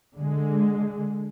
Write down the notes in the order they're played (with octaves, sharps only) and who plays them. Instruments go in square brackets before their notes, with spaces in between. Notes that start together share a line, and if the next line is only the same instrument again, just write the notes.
[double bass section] D3 G#3